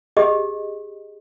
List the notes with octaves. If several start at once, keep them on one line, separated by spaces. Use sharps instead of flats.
G4 G#4 D#5